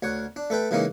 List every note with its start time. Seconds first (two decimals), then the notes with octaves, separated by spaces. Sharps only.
0.03 D2 C#5 F#5
0.36 D4
0.50 A3 A4 B4 G5
0.71 C#3 E3 G#3 A#3 C#4 D#4